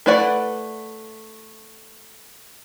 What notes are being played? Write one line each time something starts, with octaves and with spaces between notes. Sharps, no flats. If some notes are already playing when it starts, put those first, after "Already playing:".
A3 E4 B4 D5 F#5